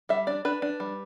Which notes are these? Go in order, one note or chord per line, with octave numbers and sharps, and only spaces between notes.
G3 E5
D4 D5
D4 B4
D4
G3